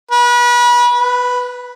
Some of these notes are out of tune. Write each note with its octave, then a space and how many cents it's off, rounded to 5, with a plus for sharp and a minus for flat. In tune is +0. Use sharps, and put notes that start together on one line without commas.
B4 -30
B4 +0